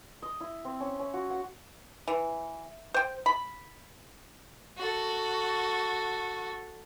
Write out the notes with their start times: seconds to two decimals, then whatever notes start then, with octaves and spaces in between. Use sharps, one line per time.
0.22 D#5
0.40 E4
0.65 C4
0.80 C#4
0.99 C#4
1.14 F#4
1.30 F#5
2.08 E3
2.94 C5 G5
3.26 B5
4.77 F#4 A4